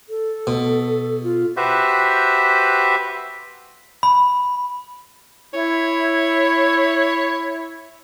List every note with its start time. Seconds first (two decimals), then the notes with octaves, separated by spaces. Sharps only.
0.09 A4
0.47 B2
1.23 F4
1.57 F#4 G4 B4 C5 E5
4.03 B5
5.54 E4 C#5